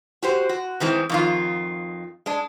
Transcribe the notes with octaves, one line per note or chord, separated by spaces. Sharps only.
F#4 G4 C5
F#4
D#3 E3 G#3 C4
F2 D#3 F4
G#3 D4